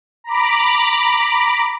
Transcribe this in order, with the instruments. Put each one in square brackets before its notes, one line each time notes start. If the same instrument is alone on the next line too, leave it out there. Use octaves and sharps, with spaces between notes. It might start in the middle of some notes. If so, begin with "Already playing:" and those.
[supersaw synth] A#5 B5 D6